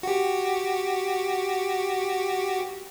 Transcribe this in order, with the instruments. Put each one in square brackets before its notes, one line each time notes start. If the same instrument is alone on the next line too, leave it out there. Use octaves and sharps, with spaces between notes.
[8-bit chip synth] F#4 G4